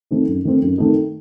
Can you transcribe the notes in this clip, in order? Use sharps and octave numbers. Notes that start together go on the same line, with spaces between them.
D#3 A3 C4 D#4
F#2
D#3 A3 C4 D#4
F#2
D#3 A3 C4 D#4